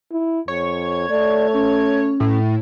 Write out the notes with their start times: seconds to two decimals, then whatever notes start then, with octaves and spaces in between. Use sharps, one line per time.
0.12 E4
0.48 F2 C#5
1.10 A3 D5
1.53 C#4
2.20 A2